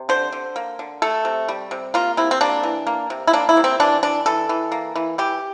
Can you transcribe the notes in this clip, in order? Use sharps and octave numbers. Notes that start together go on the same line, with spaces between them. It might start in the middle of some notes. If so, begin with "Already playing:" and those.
Already playing: C3
D3 C5
D3
A#3
D3
A3 A4
C3
G3
C3
A#3 F4
C3 E4
C4
A#3 D4
E3
A#3
C3
E4
A#3 D4
E4
C3
C4
E3 D4
E3 D4
E3 A4
E3
A#3
E3
E3 G4